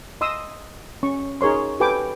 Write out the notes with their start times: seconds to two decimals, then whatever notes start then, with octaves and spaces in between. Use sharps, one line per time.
0.21 D#5 C6 D#6 E6
1.03 C#4 C#6
1.41 D#4 G#4 A#4 C#5 C6
1.80 G4 A4 B4 G5 G#5 D6